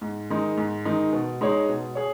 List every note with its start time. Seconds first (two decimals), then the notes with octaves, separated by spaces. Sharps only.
0.01 G#2
0.30 D#3 G#3 D#4
0.57 G#2
0.85 D#3 G#3 D#4
1.13 B2
1.41 G#3 D#4 G#4 C#5
1.68 B2
1.95 G#4 C#5